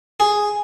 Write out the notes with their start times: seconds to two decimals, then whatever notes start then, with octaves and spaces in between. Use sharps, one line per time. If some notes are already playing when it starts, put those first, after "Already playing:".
0.20 G#4